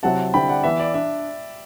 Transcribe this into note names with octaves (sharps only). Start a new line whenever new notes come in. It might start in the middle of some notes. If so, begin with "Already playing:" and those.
C3 F#3 C4 E4 F#5 A5
D3 G3 C4 E4 G5 B5
D5 F#5
E3 B3 E4 E5
D5
D4 E5